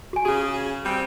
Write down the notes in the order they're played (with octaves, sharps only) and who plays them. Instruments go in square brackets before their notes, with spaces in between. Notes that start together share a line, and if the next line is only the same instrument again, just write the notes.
[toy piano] F#4 G#5
[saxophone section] C#3 G#4 [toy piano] F#4
[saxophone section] G3 C4